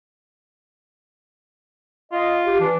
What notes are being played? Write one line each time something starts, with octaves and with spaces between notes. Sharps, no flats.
F4 D#5
G4
E3 D4